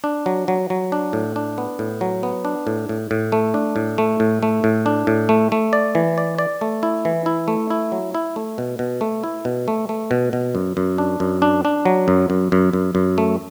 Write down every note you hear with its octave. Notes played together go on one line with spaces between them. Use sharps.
D4
F#3
F#3
F#3
D4
A2
D4
B3
A2
F#3
B3
D4
A2
A2
A2
A3
D4
A2
A3
A2
A3
A2
D4
A2
A3
A3
D5
E3
D5
D5
A3
E4
E3
E4
A3
E4
F#3
E4
A3
B2
B2
A3
E4
B2
A3
A3
B2
B2
F#2
F#2
D4
F#2
D4
D4
F#3
F#2
F#2
F#2
F#2
F#2
A3